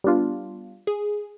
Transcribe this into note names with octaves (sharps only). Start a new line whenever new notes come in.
G3 B3 D4 F4
G#4